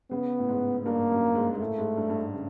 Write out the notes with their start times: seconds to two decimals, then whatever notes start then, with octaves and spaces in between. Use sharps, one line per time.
0.11 C#3 B3
0.39 A2
0.49 G#2
0.85 G2 A#3
1.10 F#2
1.35 G#2
1.54 G#2
1.60 A2 A3
1.79 G#2
1.97 G2
2.10 G2
2.16 G#2
2.34 C#3